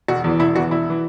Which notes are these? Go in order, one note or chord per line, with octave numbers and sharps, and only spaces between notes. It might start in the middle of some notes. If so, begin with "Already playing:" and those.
E1 F#4
E2 E3
E1 E4
E2 E3 F#4
E1 E4
E3